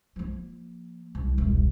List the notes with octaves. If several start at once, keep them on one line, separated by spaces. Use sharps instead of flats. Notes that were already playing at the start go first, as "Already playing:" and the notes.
F3 A#3
C2
E1 C2